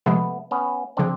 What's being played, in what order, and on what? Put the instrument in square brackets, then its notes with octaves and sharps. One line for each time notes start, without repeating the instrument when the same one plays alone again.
[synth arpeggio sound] C3 F3 G#3 [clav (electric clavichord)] A3 B3
[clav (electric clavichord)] B3 C#4
[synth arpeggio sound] C#3 F3 [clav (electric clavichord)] C4 D4